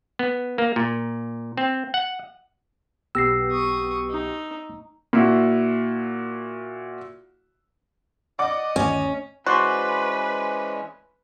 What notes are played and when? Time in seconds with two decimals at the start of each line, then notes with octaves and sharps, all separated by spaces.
0.19 B3
0.58 A#3
0.76 A#2
1.57 C4
1.94 F#5
3.15 B1 B3 G4 E6 A#6 C7
3.51 C#6 D#6
4.10 D#4
5.13 A#2 E4 F#4
8.39 D5 D#5 F#5 D6
8.76 G1 D#2 A3 C#4
9.46 E3 G#3 C#4 F#4 B4 C5 D5 C6